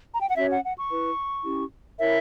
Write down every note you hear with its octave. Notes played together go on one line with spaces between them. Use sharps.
A#5
G5
F#5
C#4 F#4 C#5 E5
F#5
F#5
C#6
E4 B4
C#4 E4 G4
E4 A#4 C#5 E5